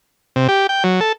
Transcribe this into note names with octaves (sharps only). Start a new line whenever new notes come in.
C3
G4
G5
F#3
A4